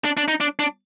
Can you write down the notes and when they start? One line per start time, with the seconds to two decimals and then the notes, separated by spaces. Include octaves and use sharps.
0.05 D4
0.17 D4
0.28 D#4
0.40 D4
0.59 D4